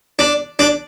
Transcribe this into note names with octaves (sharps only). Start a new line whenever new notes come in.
D4
D4